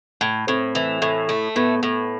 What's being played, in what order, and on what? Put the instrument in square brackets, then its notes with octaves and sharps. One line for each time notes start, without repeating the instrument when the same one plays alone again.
[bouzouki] A2
[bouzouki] A2 [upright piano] C4
[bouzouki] E3
A2
A3
[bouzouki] A2 [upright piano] B3
[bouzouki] A2